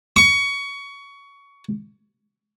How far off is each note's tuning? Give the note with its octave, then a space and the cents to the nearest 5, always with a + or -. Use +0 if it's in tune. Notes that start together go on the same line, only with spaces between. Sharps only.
C#6 +20